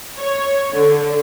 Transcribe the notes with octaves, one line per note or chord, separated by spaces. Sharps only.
C#5
D3